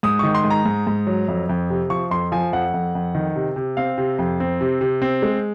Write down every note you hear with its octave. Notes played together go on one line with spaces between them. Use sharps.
G#2 D#6
D#3 C#6
C6
G#2
A#5
G#2
G#2
F#3
F2
F2
C3
F3 C#6
F2 C6
F3 G#5
F2 F#5
F2
F2
D#3
C3
C3
C4 F5
C3
F2
C4
C3
C3
C4
G#3